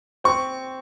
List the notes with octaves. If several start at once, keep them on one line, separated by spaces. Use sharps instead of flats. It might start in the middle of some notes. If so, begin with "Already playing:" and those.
C4 C#6